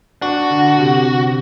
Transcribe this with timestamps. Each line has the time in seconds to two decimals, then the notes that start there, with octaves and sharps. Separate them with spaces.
0.21 D4 F#4
0.50 D3
0.78 C3
1.07 C3